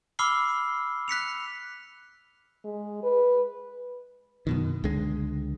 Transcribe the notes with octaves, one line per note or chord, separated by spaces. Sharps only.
B5 D6 E6 F6 C7 G7
F#6 B6 C#7 F7
G#3
B4
F#2 B2 D#3
C#2 D3 G#3